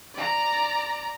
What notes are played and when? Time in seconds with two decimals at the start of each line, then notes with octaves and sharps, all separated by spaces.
0.14 D5 A#5